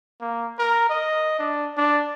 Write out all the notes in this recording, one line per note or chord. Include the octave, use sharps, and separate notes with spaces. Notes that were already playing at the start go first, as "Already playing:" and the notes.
A#3
A#4
D#5
D4
D4